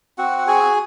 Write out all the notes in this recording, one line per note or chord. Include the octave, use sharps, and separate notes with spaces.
C4 F#4 F#5
F#5
F#4 G#4 G#5